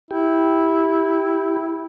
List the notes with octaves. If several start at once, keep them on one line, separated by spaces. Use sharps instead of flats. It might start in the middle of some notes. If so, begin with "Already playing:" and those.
E4 G4